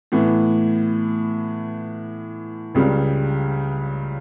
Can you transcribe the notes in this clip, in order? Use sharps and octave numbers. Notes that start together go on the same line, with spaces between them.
A2 E3 B3
C#2 C#3 G3